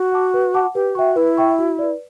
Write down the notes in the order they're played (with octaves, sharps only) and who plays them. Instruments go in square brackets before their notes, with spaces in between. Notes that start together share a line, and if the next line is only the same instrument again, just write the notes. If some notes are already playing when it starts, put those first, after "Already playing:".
Already playing: [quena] F#4
[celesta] F#5 A5 D6
B4
F#5 A5 D6
[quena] G4 [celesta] B4
[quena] F#4 [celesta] E5 G5 C#6
[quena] E4 [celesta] B4
[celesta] E5 G5 C#6
F#4
B4 D5